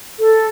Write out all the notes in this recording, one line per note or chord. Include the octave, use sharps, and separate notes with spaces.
A4